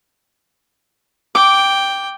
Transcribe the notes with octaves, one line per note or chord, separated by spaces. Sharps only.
G5 D6